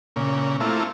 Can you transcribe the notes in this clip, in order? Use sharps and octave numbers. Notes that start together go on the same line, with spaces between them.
A#2 C#3
A3 A#3 C4 E4 F4